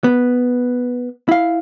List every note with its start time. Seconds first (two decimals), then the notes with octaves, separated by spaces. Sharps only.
0.04 B3
1.29 E4 F5